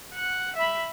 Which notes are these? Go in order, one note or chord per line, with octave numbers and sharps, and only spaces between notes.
F#5
E5 B5